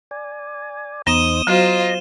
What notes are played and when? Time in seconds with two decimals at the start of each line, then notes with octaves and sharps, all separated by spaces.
0.11 D5 G#5
1.07 E2 B3 D#4 C5 D#6 D#7 E7 G7
1.47 F#3 F4 F#4 C5 D#5 A#5